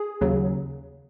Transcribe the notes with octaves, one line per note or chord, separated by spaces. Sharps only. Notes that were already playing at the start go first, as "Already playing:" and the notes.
Already playing: G#4
D#2 C#3 F#3